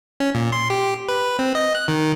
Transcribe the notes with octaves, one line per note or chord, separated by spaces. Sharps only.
C#4
A#2
C6
G4
B4
C4
D#5
F#6
D#3